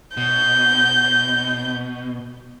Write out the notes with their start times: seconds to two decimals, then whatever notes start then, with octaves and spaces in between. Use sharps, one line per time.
0.17 B2 G6